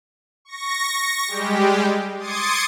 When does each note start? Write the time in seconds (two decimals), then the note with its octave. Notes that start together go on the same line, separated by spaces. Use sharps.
0.45 C#6 A#6
1.28 G3 G#3 G4
2.17 C6 D6 D#6 G#6 A6 C#7